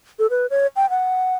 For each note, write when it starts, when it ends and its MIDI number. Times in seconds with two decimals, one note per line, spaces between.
0.19 0.27 69
0.30 0.46 71
0.50 0.67 73
0.76 0.89 79
0.90 1.36 78